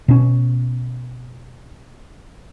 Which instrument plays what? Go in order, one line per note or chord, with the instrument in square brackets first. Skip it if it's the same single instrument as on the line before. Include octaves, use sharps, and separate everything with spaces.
[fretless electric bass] B2 C#4